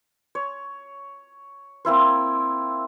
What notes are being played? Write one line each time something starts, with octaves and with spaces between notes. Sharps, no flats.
C#5
A#3 C4 E4 C5